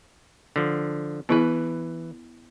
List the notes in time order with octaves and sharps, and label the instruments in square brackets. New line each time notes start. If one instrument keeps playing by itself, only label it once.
[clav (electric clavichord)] D3 F3
[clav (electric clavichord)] E3 B4 [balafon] B3 E4 G#4